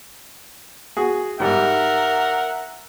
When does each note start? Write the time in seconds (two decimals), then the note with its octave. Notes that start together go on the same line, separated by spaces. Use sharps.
0.97 F#4 G#4
1.40 G#2 G3 A#4 E5 F#5